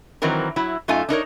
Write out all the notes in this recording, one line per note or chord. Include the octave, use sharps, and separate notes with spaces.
D#3 E3 F#3 C4 A#4
F#3 E4
F#2 A3 D#4 F4 A4 G#5
D4 D#4 A#4 C#5